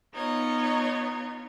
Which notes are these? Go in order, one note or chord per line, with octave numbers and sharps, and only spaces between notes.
B3 D#4 F4 C#5